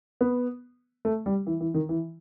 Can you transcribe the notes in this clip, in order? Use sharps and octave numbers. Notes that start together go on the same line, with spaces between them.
B3
A3
G3
E3
E3
D#3
E3